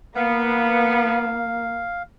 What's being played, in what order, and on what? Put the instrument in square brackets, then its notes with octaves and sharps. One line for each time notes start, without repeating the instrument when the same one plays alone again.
[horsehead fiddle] A#3 [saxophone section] B3 [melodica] F5